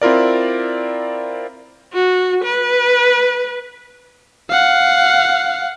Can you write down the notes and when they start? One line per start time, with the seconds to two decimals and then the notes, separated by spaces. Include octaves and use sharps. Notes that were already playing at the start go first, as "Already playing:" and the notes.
0.02 C4 E4 F4 A#4 D5
1.93 F#4
2.44 B4
4.49 F5 F#5